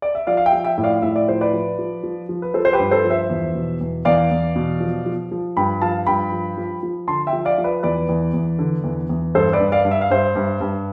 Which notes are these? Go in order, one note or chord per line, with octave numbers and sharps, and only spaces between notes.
D5
E5
F3 D5 F5
F5
E5 G5
F3
E5 G5
A2
D5 F5
A2 E5
D5
F3 C5
B4 D5
F3
F3
F3
F3
B4
F3 A4 C5
C5
G4 B4
G2
A4 C5
F3
C5 E5
E2
B2
E2
E2 D5 F5
E2
B2
F3
F3
F3
G2 G5 B5
F3 F5 A5
G2 G5 B5
F3
F3
F3
D3 A5 C6
E5 G5
F3
D5 F5
F3
B4 D5
E2 B4 D5
E2
E2
D3
E2
E2
G2 A4 C5
B4 D5
G2
D5 F5
G2
E5
F5
G2 C5 E5
G2
G2